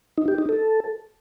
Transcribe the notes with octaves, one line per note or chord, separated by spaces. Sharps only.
D#4
G4
D#4
A4